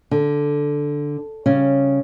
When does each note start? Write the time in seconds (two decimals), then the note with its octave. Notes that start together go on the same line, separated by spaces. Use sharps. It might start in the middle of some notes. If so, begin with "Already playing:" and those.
0.11 D3
1.46 C#3 G3 C#4